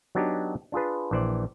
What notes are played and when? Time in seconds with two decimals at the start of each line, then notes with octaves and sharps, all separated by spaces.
0.15 F#3 B3 D4 D#4 G4
0.72 D4 F4 G#4 B4
1.11 A#1 E3 C5 D5